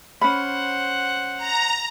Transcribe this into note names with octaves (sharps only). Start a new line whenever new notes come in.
C#4 C5 F#5 B5
A#5